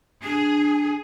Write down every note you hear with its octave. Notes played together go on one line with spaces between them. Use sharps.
D4 G#4